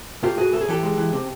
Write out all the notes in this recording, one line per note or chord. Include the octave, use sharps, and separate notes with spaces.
A2 F4 G4
A2 F#4 G#4
A2 A4
G#4
E3 G4 A4
G#3
E3
C3